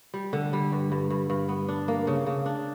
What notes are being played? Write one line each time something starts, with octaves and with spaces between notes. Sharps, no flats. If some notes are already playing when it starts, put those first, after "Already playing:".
G3
D3
G3
G2
G2
G2
G2
B3
D4
A#3
C#3
C#3
D4